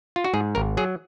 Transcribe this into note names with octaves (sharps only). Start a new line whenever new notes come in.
F4
F#4
G#2 G#4
G#1 A#4
F#3 G#4